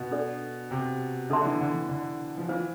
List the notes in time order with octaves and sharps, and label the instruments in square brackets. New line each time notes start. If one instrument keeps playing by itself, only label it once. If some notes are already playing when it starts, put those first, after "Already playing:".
Already playing: [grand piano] B2
[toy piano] D4 A4 D5
[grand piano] C3
[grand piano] D3 [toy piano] D4 A4 E5 A5 C6
[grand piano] D3
E3
D3
E3
D3
F3
[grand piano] E3 [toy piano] D4 F4 C5 F5